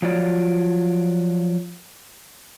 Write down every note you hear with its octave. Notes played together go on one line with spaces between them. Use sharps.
F3 F#3 F4 D5